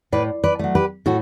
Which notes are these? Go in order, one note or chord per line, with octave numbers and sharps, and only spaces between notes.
A2 B4 D5
B4 D5
F#3 A3
G4 B4
A2 F#4 A4